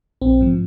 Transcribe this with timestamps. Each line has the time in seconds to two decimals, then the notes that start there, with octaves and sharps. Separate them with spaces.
0.22 A#1 C4
0.41 G#2 F3